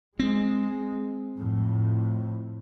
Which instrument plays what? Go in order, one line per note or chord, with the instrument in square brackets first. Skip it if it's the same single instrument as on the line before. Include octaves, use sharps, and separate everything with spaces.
[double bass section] G#3 [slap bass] C4
[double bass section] F2 A2